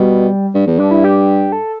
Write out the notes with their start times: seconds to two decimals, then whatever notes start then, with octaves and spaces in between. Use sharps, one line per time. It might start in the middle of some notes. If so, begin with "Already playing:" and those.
Already playing: B2 G3
0.54 G2
0.67 E2
0.79 G2 D4
0.91 E4
1.04 G4
1.52 A4